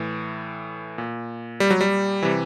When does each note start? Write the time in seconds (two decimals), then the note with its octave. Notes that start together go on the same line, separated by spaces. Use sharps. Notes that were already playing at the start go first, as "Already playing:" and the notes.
Already playing: A2 E3
0.98 A#2
1.60 G3
1.70 F#3
1.81 G3
2.23 C3 E3